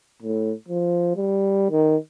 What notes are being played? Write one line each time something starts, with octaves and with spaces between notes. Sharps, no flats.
A2
F3
G3
D#3